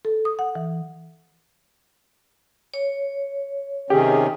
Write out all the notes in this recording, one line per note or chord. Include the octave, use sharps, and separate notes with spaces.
A4
D#6
F#5
E3
C#5
C3 D#3 C#4 G4 G#4